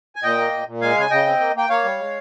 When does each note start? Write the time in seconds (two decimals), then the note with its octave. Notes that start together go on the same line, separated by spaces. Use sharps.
0.16 G#5
0.23 A#2 D#5 G5
0.38 A#3
0.53 A#2
0.67 A#2
0.81 G#3 F5 G#5
0.97 C#3 G#5
1.10 C#3 D#5 G5
1.26 C4
1.40 A#3
1.55 A#3 G5
1.69 A#3 C#5 F5
1.84 G3
1.99 G#3